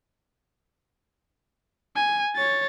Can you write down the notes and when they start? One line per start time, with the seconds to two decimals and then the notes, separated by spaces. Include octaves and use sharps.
1.96 G#5
2.36 C#5 A6